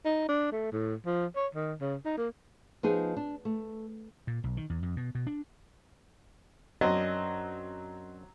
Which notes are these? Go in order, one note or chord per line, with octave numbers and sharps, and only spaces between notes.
D#4
D4
A3
A2
F3
C#5
D#3
C#3
D#4
A#3
F3 B3 D#4 G#4
D4
A3
A#2
B1
D#3
E2
F2
B2
B2
D4
F#2 F#3 C4 D4 D#5